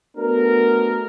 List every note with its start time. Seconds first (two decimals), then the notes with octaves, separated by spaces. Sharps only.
0.17 A3 B3 D4 F#4 A4 A#4